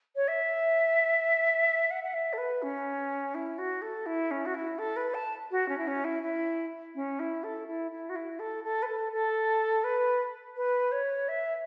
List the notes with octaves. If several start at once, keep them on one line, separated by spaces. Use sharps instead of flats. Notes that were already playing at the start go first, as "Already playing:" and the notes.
C#5
E5
F#5
F#5
E5
A4
B4
C#4
E4
F#4
A4
E4
C#4
F#4
E4
A4
B4
A5
F#4
C#4
E4
C#4
E4
E4
C#4
E4
A4
E4
E4
F#4
E4
A4
A4
B4
A4
A4
B4
B4
C#5
E5